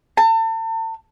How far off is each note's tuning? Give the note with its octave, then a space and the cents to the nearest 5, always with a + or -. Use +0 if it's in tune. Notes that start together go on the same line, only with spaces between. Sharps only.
A5 +40